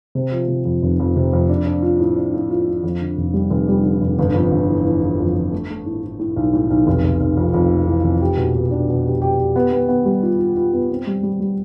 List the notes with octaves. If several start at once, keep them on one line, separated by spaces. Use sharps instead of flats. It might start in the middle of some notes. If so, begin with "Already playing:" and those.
C3
F3
C3
F2
F1
F2
C3
F2
D4
D4
F4
A2
D4
A2
F4
A2
F2
D3
F1
G3
F1
G3
D3
F1
G1
F2
G1
E3
E3
E3
F2
F2
A3
A3
A2
A2
A2
B1
A2
B1
F1
F1
F1
F2
F2
A3
E3
F1
G4
B2
B2
D4
B2
G4
G4
G4
B3
B3
B3
G3
F4
F4
F4
B3
C4
G3
G3
G3